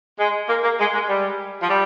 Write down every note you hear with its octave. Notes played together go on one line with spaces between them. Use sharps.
G#3
A#3
A#3
G#3
G#3
G3
F3
G3